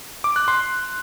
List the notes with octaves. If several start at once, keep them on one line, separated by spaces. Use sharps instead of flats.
D6
F#6
C6